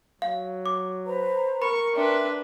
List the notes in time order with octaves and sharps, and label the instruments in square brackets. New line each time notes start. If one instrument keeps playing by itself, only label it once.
[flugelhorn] F#3 [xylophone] F5
[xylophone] D6
[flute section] B4 C5 A#5
[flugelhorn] A#4 [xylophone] B5 [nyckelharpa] C#6
[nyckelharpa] D4 B4 [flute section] E5 G5 C6